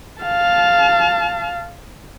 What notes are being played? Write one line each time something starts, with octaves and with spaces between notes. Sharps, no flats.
F5 A5